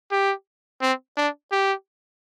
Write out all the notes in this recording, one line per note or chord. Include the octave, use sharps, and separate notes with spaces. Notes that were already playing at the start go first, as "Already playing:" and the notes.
G4
C4
D4
G4